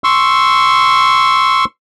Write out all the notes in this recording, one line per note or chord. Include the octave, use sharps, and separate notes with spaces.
C6 C#6 E6